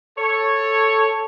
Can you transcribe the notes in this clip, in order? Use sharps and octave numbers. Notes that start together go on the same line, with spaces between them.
A4 C#5